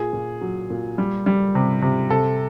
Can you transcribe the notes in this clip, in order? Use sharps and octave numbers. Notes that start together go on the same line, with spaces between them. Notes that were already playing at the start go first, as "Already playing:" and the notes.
Already playing: A#2 G#4
A#2
F#3
A#2
G3
G3
C3
C3
C3 A4